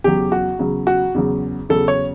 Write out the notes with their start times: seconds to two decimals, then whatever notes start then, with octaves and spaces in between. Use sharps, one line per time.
0.04 E2 C#3 F#3 G4
0.32 F#4
0.59 E2 C#3 F#3
0.87 F#4
1.14 E2 C#3 F#3
1.69 E2 C#3 F#3 A4
1.88 C#5